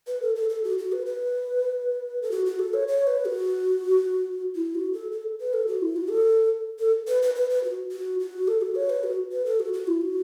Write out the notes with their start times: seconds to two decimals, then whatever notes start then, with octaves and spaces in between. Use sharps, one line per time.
0.08 B4
0.22 A4
0.36 A4
0.49 A4
0.64 F#4
0.78 F#4
0.92 B4
1.06 B4
2.22 A4
2.31 F#4
2.46 F#4
2.59 A4
2.74 C#5
2.88 C#5
3.07 B4
3.25 F#4
4.55 E4
4.75 F#4
4.93 A4
5.12 A4
5.40 B4
5.53 A4
5.67 F#4
5.82 E4
5.96 F#4
6.10 A4
6.79 A4
7.08 B4
7.22 B4
7.35 B4
7.50 B4
7.64 F#4
7.92 F#4
8.20 F#4
8.48 A4
8.62 F#4
8.75 C#5
8.90 B4
9.04 F#4
9.32 B4
9.46 A4
9.60 F#4
9.73 F#4
9.87 E4
10.01 F#4